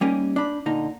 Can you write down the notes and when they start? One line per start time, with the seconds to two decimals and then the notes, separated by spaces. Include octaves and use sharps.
0.01 G3 A#3 C#4 D#4 G4 A#4
0.36 D4 B5
0.66 A#2 D3 D#4